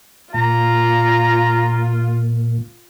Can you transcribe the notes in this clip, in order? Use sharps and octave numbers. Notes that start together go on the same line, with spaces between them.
A#2 F4 A#5